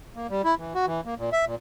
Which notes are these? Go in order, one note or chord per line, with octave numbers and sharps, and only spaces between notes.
A#3
G3
E4
E3
F#4
E3
A#3
A#2
E5
A#2